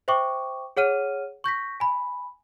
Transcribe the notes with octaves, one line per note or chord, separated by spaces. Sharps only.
C5 E5 G5 C#6 D6
G#4 C#5 F#5 F6 D#7
C#6 G6 A#6 B6
G#5 B5